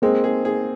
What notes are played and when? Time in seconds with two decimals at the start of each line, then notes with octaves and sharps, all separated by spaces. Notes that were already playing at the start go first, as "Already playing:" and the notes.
0.02 G#3 A#3 C4
0.24 G#4
0.45 G#4